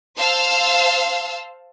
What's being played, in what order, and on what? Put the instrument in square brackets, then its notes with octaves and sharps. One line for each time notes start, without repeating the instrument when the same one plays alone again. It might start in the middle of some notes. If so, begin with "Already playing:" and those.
[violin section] C5 F5 A5 E6